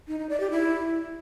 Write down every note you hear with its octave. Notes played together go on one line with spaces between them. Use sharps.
D#4
D#4
D5
G4
E4